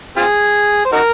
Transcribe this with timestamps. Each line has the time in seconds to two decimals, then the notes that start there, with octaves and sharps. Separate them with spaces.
0.17 C4 F4 G#4
0.85 C5
0.92 D#4 F#4 A#4